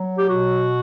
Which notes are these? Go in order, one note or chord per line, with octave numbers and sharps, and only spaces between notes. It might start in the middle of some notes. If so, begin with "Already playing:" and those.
Already playing: F#3
G4
B2 F#4